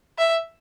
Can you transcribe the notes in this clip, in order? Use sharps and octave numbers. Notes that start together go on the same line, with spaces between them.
E5